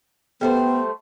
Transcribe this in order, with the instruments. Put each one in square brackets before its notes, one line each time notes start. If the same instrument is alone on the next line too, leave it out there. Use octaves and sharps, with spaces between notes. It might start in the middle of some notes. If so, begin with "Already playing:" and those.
[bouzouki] G3 A3 C5 [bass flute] B3